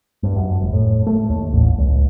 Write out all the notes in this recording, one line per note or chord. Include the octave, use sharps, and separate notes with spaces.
G2
F#2
F1
A2
A3
D#2
A1
C#2